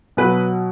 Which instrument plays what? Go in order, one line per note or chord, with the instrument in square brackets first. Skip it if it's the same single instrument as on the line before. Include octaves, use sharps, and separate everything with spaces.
[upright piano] B2 F#3 B4